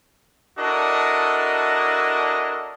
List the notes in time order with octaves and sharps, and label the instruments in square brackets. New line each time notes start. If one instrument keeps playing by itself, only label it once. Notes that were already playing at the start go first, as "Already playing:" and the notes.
[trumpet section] D4 E4 F#4 A4 A#4 D#5